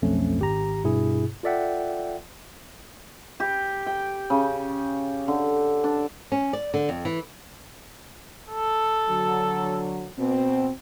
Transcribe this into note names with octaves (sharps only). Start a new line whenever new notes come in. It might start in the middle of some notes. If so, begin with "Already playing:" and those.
B1 F2 A3 C#4
G#1 G4 A#5
G2 B2 E4 G#4
F4 A4 D5 E5 F#5 G5
G4
G5
C#3
D3
D4
C#4
D5
D3
F2
E3
A4
D3 F#3
B2 C4